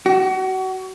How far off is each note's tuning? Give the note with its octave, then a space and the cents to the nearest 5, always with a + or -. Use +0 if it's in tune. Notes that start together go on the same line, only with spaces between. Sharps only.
F#4 +30